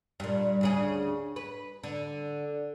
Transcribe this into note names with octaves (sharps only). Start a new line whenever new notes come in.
G2 A#2
D2 C#3 G#4
B4
D3